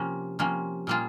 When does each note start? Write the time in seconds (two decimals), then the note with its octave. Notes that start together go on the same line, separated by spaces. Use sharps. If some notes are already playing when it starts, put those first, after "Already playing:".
Already playing: C3 F3 A#3 C#4
0.39 C3 F3 A#3 C#4
0.87 A#2 G3 A#3 F4 G#4